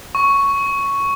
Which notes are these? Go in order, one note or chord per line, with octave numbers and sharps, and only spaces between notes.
C#6